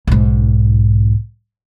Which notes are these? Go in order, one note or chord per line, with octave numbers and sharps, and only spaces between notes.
B1 G#2